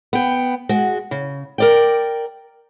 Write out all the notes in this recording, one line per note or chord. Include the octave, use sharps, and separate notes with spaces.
B3 G5
G#3 F#4
C#3
A#4 D5 G5